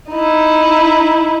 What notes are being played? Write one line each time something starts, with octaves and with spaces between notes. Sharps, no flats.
D#4 E4